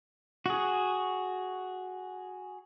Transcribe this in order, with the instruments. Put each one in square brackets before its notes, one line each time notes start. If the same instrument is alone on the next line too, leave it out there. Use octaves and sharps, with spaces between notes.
[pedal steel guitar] F#4 G#4